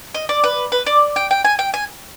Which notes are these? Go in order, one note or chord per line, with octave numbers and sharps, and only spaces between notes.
D#5
D5
B4
B4
D5
G5
G5
G#5
G5
G#5